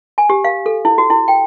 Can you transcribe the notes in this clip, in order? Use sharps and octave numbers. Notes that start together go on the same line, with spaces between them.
G#5
G4
F5
A4
E4
F#4
E4
G5